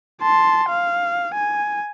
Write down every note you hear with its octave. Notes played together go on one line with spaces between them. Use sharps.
A5 C6
F5
G#5